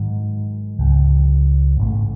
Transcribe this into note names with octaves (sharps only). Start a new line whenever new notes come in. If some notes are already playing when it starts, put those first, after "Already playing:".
Already playing: G#2 D#3 F#3
C#2 C#3 F#3
A1 G#2 E3 A3